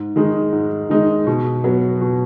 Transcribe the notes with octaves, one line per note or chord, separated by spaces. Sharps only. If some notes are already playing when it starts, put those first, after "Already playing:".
Already playing: G#2
D#3 G#3 D#4
G#2
D#3 G#3 D#4
B2
F#3 B3
B2